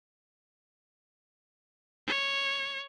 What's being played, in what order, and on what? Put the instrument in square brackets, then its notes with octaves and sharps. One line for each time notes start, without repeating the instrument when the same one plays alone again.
[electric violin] C#5